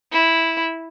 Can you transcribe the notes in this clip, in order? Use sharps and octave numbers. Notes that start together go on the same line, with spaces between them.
E4